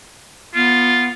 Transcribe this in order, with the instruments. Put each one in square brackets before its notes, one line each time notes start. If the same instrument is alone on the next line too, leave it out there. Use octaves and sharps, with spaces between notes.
[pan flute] B3 [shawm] F4